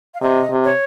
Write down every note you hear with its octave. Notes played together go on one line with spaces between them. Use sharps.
F5
C3 D#5
C3
C#5